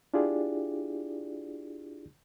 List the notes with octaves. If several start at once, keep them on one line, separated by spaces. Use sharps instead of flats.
D4 E4 F4 G4 G#4 D5